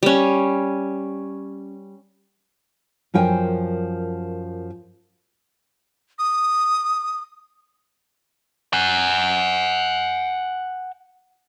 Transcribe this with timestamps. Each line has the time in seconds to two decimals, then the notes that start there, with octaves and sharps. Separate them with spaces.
0.03 G3 C#4
3.14 F#2 F3 A#4 G5 G#5
6.19 D#6
8.73 F#5 G#5